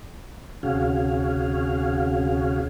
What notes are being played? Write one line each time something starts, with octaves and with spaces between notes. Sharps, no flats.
D2 C3 C#4 F#4 G#4 F5